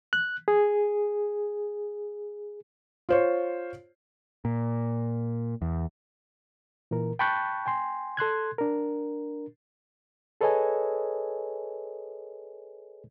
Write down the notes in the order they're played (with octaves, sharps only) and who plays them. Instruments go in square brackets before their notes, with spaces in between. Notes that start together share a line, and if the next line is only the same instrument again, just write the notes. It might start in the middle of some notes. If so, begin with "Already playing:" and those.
[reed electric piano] F#6
G#4
[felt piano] F4 C5 C#5
[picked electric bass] A#2
E2
[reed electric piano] A#2 E3 A#4
G5 A5 B5 C#6 F#6 G6
G5 G#5 C6
A4 C6 F#6 G#6
D4 A#4
G#4 A4 B4 C#5 D#5 G#5